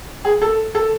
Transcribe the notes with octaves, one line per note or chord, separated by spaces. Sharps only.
G#4
A4
A4